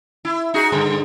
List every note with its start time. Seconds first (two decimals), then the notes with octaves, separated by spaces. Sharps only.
0.25 E4
0.54 D#4 F#4 G#4
0.72 G2 D3 G#3